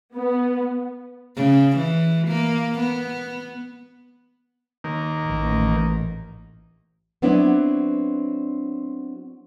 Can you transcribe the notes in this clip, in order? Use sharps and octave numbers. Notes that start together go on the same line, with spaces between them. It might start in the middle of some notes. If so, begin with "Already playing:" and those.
B3
C#3
E3
A#3
B3
D#3 A#3
A1
F#3 B3 C4 D4 E4